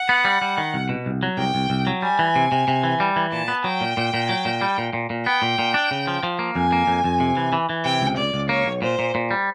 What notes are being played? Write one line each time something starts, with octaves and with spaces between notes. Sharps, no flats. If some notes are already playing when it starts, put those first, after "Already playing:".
Already playing: F#5
B3
G3
G3
D#3
C2
B2
C2
F#3
C2 G5
C2
C2
F#3
G3 G#5
E3
C3
C3
C3
E3
G3
E3
A#2 A5
B3
F#3 G5
A#2
A#2
A#2
F#3
A#2
G3
A#2
A#2
A#2
B3 G5
A#2
A#2
D4
C#3
F3
F3
A#3
F2 G#5
A#3
F2
F2
C3
E3
E3
E3
C3 G5
C#2
C#2 D5
C#2
A#3 C#5
B1
A#2 C5
A#2
A#2
G3